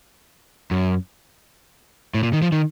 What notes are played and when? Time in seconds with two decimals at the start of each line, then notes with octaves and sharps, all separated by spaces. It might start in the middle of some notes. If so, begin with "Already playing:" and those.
0.71 F#2
2.14 A2
2.23 A#2
2.33 D#3
2.42 F3
2.52 D#3